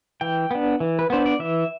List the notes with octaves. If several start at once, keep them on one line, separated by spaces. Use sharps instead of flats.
E3 G5
B3 D4
E3
B4
B3 D4 C5
D5
E3 E5